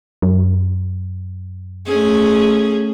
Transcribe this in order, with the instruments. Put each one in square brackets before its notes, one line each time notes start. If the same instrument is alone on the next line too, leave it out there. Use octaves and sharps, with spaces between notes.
[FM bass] F#2
[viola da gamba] A3 C#4 G#4